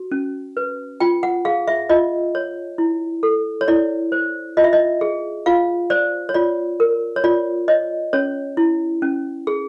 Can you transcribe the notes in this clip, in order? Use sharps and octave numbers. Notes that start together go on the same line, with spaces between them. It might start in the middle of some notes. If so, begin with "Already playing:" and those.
Already playing: F#4
C#4
B4
F4 G5
F#5
G#4 F5
E5
F4 D#5
C#5
E4
A4
C#5
E4 D5
C5
F4 D#5
E5
D#5
G#4
F4 F5
C5 D5
C#5
F4 D5
A#4
C#5
F4 D5
C#5 D#5
C#4 C#5
E4
C#4
G#4